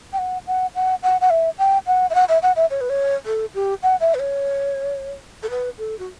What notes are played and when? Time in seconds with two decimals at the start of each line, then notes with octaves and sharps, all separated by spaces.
0.13 G5
0.18 F#5
0.47 F#5
0.75 F#5
1.03 F#5
1.21 F#5
1.30 E5
1.59 G5
1.87 F#5
2.10 E5
2.15 F#5
2.29 E5
2.42 F#5
2.56 E5
2.71 C#5
2.81 B4
2.90 C#5
3.26 A4
3.55 G4
3.83 F#5
4.00 E5
4.14 B4
4.19 C#5
5.43 A4
5.50 B4
5.78 A4
5.99 F#4